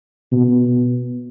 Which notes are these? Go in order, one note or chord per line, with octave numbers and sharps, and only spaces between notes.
B2